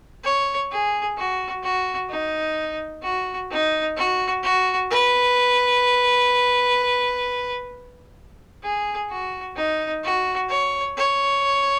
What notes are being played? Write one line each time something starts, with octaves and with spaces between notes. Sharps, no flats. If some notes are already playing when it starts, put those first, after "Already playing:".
C#5
G#4
F#4
F#4
D#4
F#4
D#4
F#4
F#4
B4
G#4
F#4
D#4
F#4
C#5
C#5